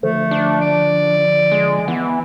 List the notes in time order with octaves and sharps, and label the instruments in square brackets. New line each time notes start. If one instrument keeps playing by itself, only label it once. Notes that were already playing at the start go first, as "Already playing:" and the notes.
[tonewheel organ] D3 F3 [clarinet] A3
[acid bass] D4
[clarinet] D5
[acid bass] G#3
[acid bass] E3 [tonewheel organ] B3